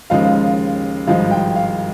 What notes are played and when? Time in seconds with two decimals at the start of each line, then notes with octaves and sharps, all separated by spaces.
0.10 D#2 C#3 F3 G#3 F5
1.07 G#1 G2 F3 G#3 F5
1.31 G5
1.56 F5